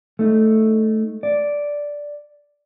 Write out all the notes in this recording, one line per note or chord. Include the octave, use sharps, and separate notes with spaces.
A3 D#4
D5